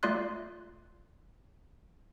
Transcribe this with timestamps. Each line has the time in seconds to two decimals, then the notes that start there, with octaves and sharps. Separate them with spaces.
0.03 A3 F4 D5 C6 F#6